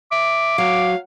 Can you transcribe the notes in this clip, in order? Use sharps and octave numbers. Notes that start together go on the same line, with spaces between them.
E5 D6
F#3 F5